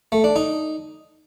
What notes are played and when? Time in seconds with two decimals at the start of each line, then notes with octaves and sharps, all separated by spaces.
0.12 A3
0.24 D4
0.36 D#4